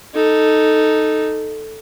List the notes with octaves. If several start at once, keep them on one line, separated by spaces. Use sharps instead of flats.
D#4 A4